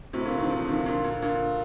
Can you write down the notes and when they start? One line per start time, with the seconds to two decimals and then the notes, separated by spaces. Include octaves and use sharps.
0.13 A2 C3
0.25 A#2 D3
0.37 C3 D#3
0.50 D3 F3
0.68 C3 D#3
0.86 A#2 D3
1.04 A#2 D3
1.22 A#2 D3